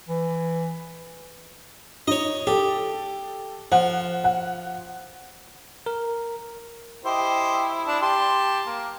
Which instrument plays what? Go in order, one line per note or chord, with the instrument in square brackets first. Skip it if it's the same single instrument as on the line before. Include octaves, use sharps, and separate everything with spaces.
[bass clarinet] E3
[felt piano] D#4 [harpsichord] C#5 D#5
[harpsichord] G4 [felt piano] A4
[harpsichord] F3 [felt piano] F#5
[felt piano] F#5
[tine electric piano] A#4
[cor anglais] E4 [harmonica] G4 C5 D#5
[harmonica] D4 A5
[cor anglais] G4 [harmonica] A5 C6
[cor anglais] A#3